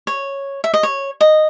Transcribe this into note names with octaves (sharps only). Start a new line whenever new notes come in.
C#5
E5
D#5
C#5
D#5